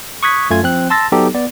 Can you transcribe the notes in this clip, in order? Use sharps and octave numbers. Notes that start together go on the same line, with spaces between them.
C#6 D#6 F#6 G#6 B6
F#2 A3 F4 G#5 G#6
F3 C4 F#6
A5 C6 E6 A6 A#6
F#3 B3 D#4 G4 A4
B3 D5